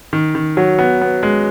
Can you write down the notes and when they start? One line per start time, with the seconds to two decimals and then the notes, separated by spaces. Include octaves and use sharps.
0.13 D#3
0.35 D#3
0.57 F#3
0.79 B3
1.01 B3
1.23 G#3